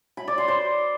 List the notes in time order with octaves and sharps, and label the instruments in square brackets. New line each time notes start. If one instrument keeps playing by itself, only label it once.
[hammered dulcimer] B5
D5
C6
C5